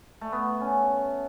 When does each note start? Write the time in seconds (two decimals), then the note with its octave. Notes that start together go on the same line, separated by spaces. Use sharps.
0.21 A3
0.32 B3
0.61 C#4